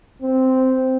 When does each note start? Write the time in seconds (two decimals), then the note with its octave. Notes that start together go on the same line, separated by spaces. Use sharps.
0.22 C4